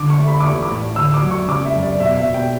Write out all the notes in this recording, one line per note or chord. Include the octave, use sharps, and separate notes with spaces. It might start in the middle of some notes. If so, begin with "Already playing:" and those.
Already playing: D3 D6
C#6
A3
B5
D6
E3 C#6
D6
A2
D2 E6
D6
F#3
C#6
C#3 D6
E5
F#2
D5
B2 E5
E5
B2
G5